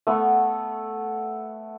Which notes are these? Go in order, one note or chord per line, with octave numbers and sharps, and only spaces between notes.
A3 B3